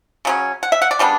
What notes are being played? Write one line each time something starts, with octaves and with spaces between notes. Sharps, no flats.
C#3 F#3 C#4
F#5
E5
F#5
D5
C#3 G3 B3 D4